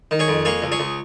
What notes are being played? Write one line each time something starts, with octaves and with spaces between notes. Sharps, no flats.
D#3
G#4 C#5
F2
A#3 G#4 C#5
C#2
G#4 C#5
C#2